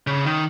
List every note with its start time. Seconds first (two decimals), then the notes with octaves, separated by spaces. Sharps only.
0.07 C#3
0.25 D#3